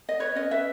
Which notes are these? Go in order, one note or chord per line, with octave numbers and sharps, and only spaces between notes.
D#5
B4 C#5
C#4 D#5
B4 E5